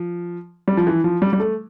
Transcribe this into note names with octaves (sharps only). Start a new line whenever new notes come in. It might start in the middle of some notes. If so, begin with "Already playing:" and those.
Already playing: F3
G3
F3
E3
F3
G3
G3
A3